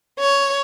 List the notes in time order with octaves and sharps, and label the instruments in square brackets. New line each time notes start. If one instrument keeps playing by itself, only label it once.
[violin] C#5